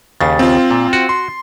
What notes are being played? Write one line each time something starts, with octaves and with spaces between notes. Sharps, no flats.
D#2 C#3 A6
C4 F4
A#2
F#4
C6